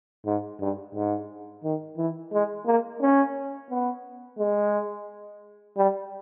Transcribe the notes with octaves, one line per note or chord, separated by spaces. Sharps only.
G#2
G2
G#2
D#3
E3
G#3
A#3
C#4
B3
G#3
G3